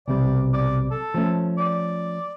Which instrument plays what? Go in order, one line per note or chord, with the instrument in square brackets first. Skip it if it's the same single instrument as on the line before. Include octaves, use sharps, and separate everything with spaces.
[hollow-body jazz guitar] B1 C3 G3 [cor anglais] D5
[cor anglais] D5
A4
[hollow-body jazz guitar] F3 A3 C#4
[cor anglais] D5